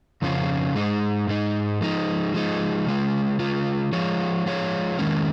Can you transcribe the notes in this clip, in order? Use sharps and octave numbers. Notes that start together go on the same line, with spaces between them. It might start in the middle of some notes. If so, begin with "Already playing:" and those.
F2 C#3 F3 C#4 F4
G#2 G#3 D#4
G#2 G#3 D#4
F3 G#3 D#4
F3 G#3 D#4
C#3 G#3 F4
C#3 G#3 F4
F3 G#3 F4 C#5
F3 G#3 F4 C#5
D#3 G#3 C#4